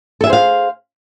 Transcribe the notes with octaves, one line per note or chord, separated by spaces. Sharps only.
G#4 A4 C5 E5 F5